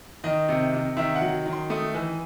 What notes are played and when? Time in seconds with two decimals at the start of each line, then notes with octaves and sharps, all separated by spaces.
0.24 D#3 D#5
0.49 C3
0.73 C3
0.97 D#3 E5
1.15 F#5
1.21 F#3
1.46 D#3
1.52 C6
1.70 A3 D#6
1.95 E3